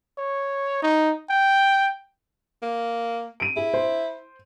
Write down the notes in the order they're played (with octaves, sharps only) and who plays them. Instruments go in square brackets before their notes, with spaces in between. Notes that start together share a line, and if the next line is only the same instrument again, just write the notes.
[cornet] C#5
D#4
G5
[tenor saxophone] A#3
[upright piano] D7 D#7
[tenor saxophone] E4 [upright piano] G#4
[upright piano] C5